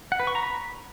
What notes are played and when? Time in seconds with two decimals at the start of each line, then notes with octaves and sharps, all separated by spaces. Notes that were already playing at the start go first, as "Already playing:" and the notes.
0.12 F#5
0.20 B4
0.27 C#6
0.35 A#5
0.43 B5